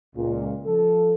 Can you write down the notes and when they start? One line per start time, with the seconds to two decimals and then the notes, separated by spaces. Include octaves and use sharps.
0.15 C#2 A#2
0.66 F3 A4